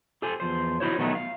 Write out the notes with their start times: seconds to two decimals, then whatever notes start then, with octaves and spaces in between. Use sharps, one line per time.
0.22 G4 A4 C5 G#5
0.40 E2 F3 C5
0.80 D#4 E4 F#4 C5 C#5
0.98 B2 D#3 F#3 A3 D#4
1.15 F5